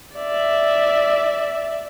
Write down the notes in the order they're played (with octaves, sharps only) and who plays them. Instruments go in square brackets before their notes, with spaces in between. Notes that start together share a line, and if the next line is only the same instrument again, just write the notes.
[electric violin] D5 E5